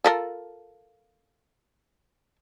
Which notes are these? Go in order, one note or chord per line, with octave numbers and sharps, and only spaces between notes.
F4 A4 A#4